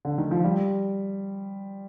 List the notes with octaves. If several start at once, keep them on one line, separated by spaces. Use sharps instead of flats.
D3
D#3
F3
G3